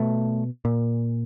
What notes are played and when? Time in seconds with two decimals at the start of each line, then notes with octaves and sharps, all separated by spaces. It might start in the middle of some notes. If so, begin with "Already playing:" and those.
Already playing: B2 A3
0.65 A#2